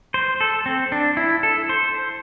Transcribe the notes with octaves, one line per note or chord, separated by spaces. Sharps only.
C5
A4
C4
D4
E4
A4
C5